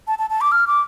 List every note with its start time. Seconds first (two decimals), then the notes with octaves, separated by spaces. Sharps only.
0.07 A5
0.19 A5
0.30 A5
0.41 D6
0.52 F6
0.67 D6